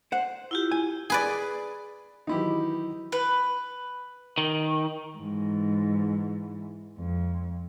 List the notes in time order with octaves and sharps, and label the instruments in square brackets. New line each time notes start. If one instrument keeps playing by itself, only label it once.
[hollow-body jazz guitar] C5 F#5
[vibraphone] E4 F4 G4
[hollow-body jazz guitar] G#5
[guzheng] G#4 B4 D5
[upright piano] D#3 E3 F#3 [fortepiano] D#4 E4 G4
[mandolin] B4
[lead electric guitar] D#3
[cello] G#2 E3
F2